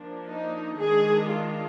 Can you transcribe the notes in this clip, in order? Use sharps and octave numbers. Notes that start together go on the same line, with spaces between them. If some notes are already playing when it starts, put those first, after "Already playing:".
Already playing: F3 A#3 D4
D#4
D#3 G#3 D4 G#4
F4